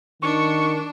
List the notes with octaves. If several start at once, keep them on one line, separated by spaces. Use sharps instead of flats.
D#3 D4 C#6